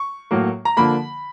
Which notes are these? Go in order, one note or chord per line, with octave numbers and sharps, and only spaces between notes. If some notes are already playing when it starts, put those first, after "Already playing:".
Already playing: C#6
A2 F#3 A#3
A#5
D3 F3 A#3 B5